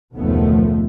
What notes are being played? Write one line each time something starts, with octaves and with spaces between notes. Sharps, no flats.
F#1 D#2 B2 F3 A3 B3